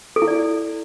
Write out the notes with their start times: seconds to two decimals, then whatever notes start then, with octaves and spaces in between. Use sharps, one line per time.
0.16 A4
0.22 E4
0.28 D5